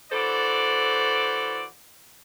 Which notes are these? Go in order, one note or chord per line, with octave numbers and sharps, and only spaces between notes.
E3 F#4 A4 C5 D5